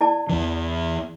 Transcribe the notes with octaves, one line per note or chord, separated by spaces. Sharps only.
E4 D5 A5
E2 E3